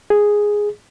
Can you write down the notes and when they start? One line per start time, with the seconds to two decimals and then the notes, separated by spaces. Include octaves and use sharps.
0.10 G#4